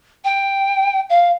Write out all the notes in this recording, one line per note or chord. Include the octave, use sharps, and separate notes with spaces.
G5
F5